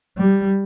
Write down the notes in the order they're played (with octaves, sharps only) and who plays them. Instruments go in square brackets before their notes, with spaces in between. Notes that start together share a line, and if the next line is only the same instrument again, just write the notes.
[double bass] G3